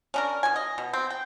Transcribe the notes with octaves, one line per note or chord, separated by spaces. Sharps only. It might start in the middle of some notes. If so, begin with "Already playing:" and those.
C#4 D4 A#4
B2 G#5
D#5
B2
C4
G5